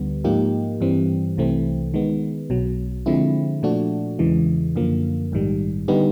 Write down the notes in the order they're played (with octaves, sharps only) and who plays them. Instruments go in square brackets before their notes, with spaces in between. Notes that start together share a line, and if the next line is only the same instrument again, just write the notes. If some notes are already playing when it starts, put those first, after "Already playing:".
Already playing: [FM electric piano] D2 D3 G3 B3
G#2 F3 A#3 D#4 G4
G2 E3 G3 C4
C2 C3 E3 A3 C4
D#3 G#3 B3
B1 B2 F#3
D3 F3 G#3 C4 E4
A#2 F3 A3 D4 F#4
E2 C#3 E3 G#3
F#2 D3 F3 A#3
A#1 G#2 D#3 G3
D3 G3 B3 D#4 G4